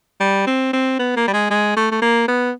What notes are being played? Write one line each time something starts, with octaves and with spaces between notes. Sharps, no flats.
G3
C4
C4
B3
A#3
G3
G#3
G#3
A3
A3
A#3
B3